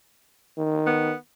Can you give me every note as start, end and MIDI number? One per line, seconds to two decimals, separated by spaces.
0.58 1.13 51
0.86 1.16 59